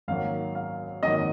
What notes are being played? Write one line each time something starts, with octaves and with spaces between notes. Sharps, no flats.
G#1 F#2 D#3 F#3 A#3 F5
F5
G#1 F#2 D#3 F#3 A#3 D#5